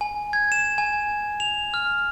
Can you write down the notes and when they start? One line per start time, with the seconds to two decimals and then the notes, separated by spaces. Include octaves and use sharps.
0.01 G#5
0.33 G#6
0.52 E7
0.78 G#5
1.40 F7
1.74 F6